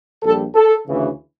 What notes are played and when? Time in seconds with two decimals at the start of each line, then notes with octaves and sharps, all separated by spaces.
0.23 A#1 A#2 G3 A4
0.55 A4
0.87 D2 C#3 E3